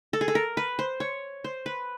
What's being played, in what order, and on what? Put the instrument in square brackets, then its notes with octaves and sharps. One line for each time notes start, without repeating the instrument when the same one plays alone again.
[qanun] A4
G#4
A4
A#4
B4
C5
C#5
C5
B4